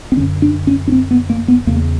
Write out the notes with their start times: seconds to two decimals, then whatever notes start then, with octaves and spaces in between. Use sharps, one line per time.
0.12 C4
0.17 D3 C#4
0.20 F#2
0.42 D4
0.67 C#4
0.88 C#4
0.92 C4
1.11 B3
1.30 A#3
1.48 B3
1.67 E2 C#3 A#3